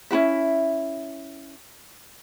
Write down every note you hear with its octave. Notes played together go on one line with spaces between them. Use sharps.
C#4 E4 F#4 E5